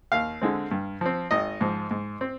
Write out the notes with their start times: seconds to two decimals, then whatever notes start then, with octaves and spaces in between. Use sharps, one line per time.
0.12 D#2 F5
0.41 D3 G#3 C4
0.71 G2
1.01 F3 C4
1.31 G#1 D#5
1.61 G#2 F3
1.91 G#2
2.21 C4